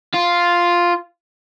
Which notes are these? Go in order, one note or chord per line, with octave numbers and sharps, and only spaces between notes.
F4